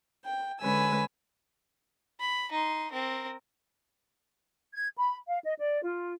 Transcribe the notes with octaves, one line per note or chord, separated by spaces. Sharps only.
G5
D3 G#3 C#4 B4 G#5 E6
B5
D#4 C6
C4 A#4
G#6
B5
F5
D#5
D5
F4